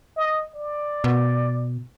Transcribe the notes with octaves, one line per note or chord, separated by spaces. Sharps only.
D#5
D5
B2